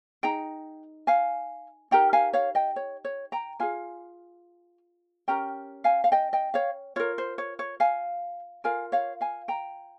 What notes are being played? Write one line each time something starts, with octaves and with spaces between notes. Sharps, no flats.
D#4 G#4 G5 A#5
F5 G#5
D#4 G4 A#4 G5 A#5
F5 G#5
C#5 F5
D#5 G5
C#5
C#5
G5 A#5
F4 G#4 F5 G#5
C#4 G4 A#4 G5 A#5
F5 G#5
F5
D#5 G5
D#5 G5
C#5 F5
F4 A#4 C#5
C5
C#5
C#5
F5 G#5
F4 A#4 F5 G#5
C#5 F5
F5 G#5
G5 A#5